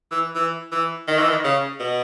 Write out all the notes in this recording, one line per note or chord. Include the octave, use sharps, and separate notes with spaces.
E3
E3
E3
D#3
E3
D#3
C#3
B2